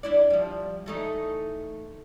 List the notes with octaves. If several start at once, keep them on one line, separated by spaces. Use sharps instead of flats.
D4 E4 D5
F3 G3
E3 A3 D#4